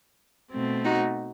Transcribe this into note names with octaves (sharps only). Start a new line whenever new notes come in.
B2 A3 C4
D#4 F#4